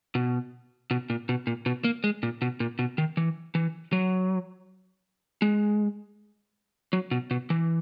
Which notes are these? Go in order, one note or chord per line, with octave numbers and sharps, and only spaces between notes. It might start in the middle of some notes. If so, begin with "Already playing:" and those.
B2
B2
A#2
B2
A#2
B2
A#3
G#3
A#2
B2
A#2
B2
D#3
E3
E3
F#3
G#3
F#3
B2
B2
E3